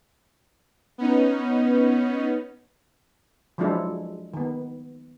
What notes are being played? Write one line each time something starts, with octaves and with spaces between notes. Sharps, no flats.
B3 C#4 D#4
F3 F#3 G#3 D4 E4 A4
D#3 B3